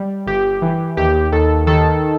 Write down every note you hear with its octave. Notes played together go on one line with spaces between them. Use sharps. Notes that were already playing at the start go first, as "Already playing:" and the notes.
Already playing: G3
G1 G4
E3
D#2 G4
D#2 A4
D#3 A4